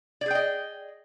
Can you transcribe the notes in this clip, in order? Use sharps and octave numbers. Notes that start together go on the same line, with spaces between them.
G#4 D5 D#5 G5